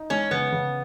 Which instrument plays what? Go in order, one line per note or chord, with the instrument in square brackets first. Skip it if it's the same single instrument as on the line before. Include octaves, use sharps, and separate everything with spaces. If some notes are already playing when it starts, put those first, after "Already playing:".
Already playing: [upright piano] D#4
[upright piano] G#3 [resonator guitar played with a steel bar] C#4
[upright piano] C#3 [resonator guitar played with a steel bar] B3
[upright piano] C#3